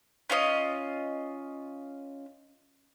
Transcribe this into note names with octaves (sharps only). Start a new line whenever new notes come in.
C#4 F4 C#5 D#5